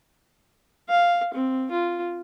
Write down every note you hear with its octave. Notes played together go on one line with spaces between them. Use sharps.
F5
C4
F4